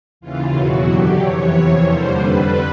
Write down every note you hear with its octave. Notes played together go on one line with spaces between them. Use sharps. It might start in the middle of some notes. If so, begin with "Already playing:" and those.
D#2 C#3 E3 F4
E2 B2 F#3 F#4
F#2 D3 F#3 G4
F2 C3 E3 C#5
E2 C3 F3
D#2 D3 G3 C5
F2 D3 G3 B4